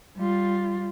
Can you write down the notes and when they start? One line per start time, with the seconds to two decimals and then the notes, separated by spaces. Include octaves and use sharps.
0.17 G3 F4